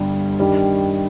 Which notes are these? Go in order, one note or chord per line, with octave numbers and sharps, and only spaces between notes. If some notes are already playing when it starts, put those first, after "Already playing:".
Already playing: G1 G2 G3
G2 D#3 G3